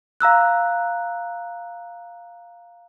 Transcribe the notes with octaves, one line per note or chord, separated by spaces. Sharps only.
F5 A#5 E6 F#6